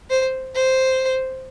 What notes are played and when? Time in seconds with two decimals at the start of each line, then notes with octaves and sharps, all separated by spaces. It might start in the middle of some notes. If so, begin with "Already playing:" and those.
0.10 C5
0.55 C5